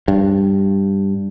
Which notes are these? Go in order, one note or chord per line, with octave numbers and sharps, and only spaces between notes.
G2